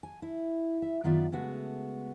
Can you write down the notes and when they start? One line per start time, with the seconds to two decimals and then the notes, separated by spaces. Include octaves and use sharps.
0.03 G#5
0.22 E4
0.82 E5
1.04 F#2 D#3 B3 F4 D5 E5
1.32 C#3 G#3 A3 B3 F#4